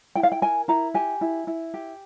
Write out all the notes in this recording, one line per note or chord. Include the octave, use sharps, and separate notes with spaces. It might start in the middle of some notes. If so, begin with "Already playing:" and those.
E4 G5
F5
G5
A#4 G#5
E4 A#5
G4 G#5
E4
E4
G4